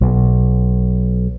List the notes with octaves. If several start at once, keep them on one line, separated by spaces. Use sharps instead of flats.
B1